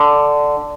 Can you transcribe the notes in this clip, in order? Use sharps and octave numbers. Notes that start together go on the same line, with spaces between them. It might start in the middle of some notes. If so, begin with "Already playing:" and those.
Already playing: D3